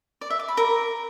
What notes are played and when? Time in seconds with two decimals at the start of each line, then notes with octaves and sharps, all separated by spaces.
0.21 D5
0.30 E5
0.39 D6
0.48 B5
0.57 A#4